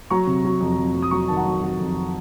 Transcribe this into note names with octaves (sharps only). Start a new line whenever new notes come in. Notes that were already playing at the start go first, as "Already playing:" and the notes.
F#3 A#5 C#6
C3
F#3
F2
F2
F#3
D#6
F#3 A#5 C#6
D#3 A5
F#5 A#5
F#3
F#3 F#5
F2